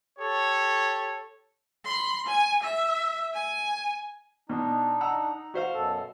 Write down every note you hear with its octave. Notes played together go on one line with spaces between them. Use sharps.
G4 A4 C#5
B5 C6
G#5
E5
G#5
B2 D4 D#4
F#5 A#5 E6
D#4
F#4 C5 F5
F#2 B2 A4